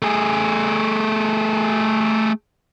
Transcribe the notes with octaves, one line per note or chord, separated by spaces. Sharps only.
A3 G#4